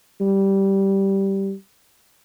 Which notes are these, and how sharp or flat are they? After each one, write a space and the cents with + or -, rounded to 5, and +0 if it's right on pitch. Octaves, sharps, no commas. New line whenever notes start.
G3 -10